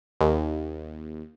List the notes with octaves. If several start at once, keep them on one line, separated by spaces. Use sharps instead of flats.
D#2